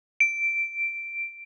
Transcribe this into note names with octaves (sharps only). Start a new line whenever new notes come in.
D7